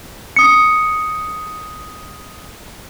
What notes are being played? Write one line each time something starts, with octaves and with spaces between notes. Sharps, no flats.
D#6 C#7